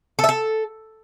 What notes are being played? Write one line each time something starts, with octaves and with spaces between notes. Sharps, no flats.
A4
E5
A4